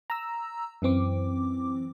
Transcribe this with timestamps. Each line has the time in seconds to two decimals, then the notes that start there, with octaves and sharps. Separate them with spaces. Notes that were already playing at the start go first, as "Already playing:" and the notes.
0.10 A#5 E6
0.82 F#2 E3 C4 D6